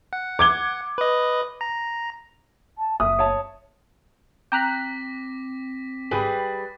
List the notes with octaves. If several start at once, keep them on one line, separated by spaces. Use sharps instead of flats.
F#5
D6 G#6 G7
B4 D#5
A#5
A5
F#1 E5 D#6
C#5 A5
C4 G5 A#5 D6 F#6 A#6 B6
G#1 G3 G#4 B4